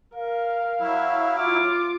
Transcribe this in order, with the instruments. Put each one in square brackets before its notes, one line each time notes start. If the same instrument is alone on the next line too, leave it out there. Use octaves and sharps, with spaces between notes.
[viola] A#4 [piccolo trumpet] F5
[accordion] F#3 E4 [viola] E5
[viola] F4 D6 [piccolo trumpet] F6